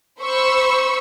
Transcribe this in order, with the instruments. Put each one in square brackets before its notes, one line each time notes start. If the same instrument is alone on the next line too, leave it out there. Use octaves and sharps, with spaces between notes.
[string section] C5 B5 C#6 E6